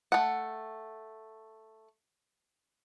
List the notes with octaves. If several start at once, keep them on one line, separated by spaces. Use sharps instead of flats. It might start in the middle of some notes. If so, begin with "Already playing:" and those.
A3 F#5